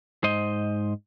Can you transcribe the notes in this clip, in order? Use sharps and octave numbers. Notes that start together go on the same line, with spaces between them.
G#2 C5 D#5